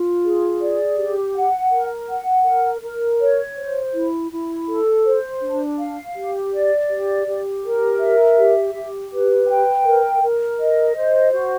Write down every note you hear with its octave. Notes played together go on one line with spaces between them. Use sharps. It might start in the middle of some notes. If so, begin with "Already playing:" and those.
Already playing: F4
G#4
D5
G4
F#5
A#4
F#5
A#4
A#4
C#5
C5
E4
E4
A4
C5
D4
F5
G4
D5
G4
G4
A#4
E5
G4
G4
B4
G5
A#4
A#4
D#5
C5
F#4